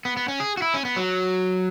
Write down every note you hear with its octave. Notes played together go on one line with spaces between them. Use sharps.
B3
B3
C#4
G#4
F#4
E4
C#4
B3
F#3